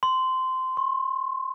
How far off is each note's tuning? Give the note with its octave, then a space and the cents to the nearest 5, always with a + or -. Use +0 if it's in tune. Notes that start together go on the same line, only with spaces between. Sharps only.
C6 -15
C6 +45